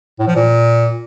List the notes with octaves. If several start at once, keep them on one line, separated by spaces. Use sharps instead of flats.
A2
F3
A#2